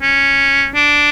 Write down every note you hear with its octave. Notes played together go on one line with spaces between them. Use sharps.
C#4
D4